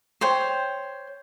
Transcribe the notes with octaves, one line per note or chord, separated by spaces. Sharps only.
C5 C#5 G5